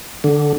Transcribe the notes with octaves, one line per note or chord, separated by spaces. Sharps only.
D3